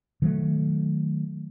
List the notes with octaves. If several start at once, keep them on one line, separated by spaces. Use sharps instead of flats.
D#3 F#3 A3